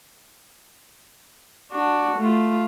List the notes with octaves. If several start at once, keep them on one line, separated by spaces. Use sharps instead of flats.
D4 F#4
A3 F4